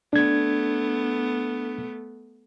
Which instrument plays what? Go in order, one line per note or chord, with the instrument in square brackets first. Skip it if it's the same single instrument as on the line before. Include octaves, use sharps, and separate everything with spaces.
[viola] A3 B3 [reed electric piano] D4 G#6